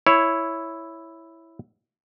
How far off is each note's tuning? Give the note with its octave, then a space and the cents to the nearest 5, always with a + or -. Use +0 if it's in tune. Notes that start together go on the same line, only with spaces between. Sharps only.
E4 +0 C#5 +0